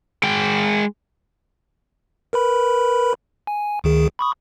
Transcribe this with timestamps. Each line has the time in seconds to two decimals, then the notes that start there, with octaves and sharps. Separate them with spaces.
0.23 G#3 G5
2.33 A#4 B4 B5
3.47 G#5
3.84 D2 D#3 G#4
4.19 B5 C#6 D#6